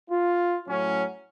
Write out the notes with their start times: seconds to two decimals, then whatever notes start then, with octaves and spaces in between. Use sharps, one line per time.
0.10 F4
0.68 A2 F#3 C#4